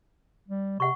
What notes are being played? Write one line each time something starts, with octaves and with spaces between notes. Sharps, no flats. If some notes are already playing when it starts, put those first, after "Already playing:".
G3
C3 F#5 C#6